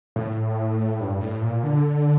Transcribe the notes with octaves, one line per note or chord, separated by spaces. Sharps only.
A2
G2
A2
A#2
D3